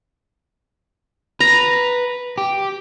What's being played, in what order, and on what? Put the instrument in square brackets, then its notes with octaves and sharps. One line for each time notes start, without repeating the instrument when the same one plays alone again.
[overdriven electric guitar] B4 [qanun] A#5
[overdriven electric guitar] G4